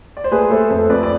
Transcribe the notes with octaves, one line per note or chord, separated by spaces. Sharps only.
D5
C5
A3 G#4 B4
A3 A4 C5
F2 A4 C5
F2 B4 D5
D5